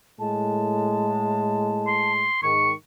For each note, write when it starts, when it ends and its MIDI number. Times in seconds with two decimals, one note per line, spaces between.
0.19 2.27 45
0.19 2.27 56
0.19 2.12 81
1.87 2.41 84
2.43 2.72 44
2.43 2.72 51
2.43 2.71 85